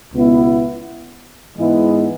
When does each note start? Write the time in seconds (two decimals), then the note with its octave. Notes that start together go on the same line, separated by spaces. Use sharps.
0.13 C#2 B2 B3 E4
1.57 G#2 E3 G#3 B3 E4